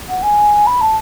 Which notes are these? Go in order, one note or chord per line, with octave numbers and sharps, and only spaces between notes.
F#5
G#5
B5
A5